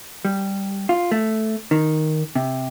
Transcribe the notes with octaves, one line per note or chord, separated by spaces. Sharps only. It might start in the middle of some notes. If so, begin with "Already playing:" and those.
G3
F4
A3
D#3
C3